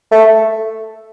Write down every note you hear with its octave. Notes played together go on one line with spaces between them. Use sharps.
A3